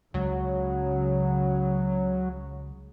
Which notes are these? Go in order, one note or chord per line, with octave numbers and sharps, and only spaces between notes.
C#2 C#3 F#3